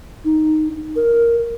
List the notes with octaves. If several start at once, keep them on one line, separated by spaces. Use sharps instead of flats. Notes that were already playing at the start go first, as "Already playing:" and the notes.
D#4
A#4